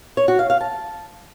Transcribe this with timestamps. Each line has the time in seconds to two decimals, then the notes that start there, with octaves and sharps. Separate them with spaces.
0.17 C#5
0.28 F#4
0.39 F5
0.50 F5
0.61 A5